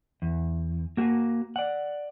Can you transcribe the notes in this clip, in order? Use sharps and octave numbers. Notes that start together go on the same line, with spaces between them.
E2
A#3 F#4
D5 F#5